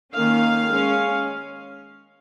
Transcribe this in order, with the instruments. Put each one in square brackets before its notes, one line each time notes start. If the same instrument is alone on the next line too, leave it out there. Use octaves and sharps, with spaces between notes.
[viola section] D#3 A#3 C#4 F5
G#3 C#4